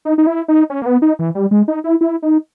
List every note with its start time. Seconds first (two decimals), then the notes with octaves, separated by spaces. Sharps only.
0.05 D#4
0.18 D#4
0.27 E4
0.48 D#4
0.70 C#4
0.82 A#3
0.86 B3
1.02 D#4
1.19 E3
1.35 G3
1.51 G#3
1.68 D#4
1.84 E4
2.01 E4
2.23 D#4